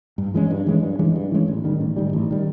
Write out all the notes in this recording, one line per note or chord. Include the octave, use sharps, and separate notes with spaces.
G2
E3 G#3 C#4
G2
E3 G#3 C#4
G2
E3 G#3 C#4
G2
E3 G#3 C#4
A1
G#2 D#3 G3
A1
G#2 D#3 G3
A1
D#3 G3